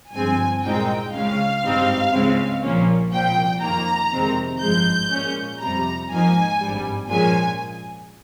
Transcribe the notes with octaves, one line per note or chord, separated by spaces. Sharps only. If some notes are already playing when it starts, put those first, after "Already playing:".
G1 G2 F3 G#3 C4 G#5
C2 A#2 G#3 C4 D#4 G5
C#2 C#3 G#3 F5
G#1 G2 G3 C4 D#4
C#2 C#3 G#3 C4
A#1 A#2 F3 A#3 C#4
C2 A#2 F3 G5
F2 D#3 A#3 A#5
F2 C3 D#3 G#3 C4
G#1 G2 F3 G#3 G6
A#2 G#3 C#4
F2 C3 G3 A#5
G#2 F3 A#3 D#4 G#5
G#1 G2 G3
A#2 F3 G#3 C#4 G#5